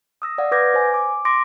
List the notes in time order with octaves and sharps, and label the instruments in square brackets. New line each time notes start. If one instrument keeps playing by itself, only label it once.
[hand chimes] D#6 E6 A#6
D5 F5 F#5
B4 D6 G6 G#6 A#6
C5 G#5
D6
C6 D6 A#6 D7